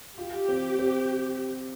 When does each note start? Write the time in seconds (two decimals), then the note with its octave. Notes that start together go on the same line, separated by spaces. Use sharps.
0.18 F4 G4
0.48 C4
0.79 C4